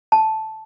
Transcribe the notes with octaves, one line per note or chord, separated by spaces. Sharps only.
A5